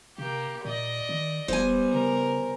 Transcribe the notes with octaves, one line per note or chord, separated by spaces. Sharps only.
C3 A#3 G4
A#2 D5 D#5
D#3
E1 G3 B3 C5 G#5
C#3 A#4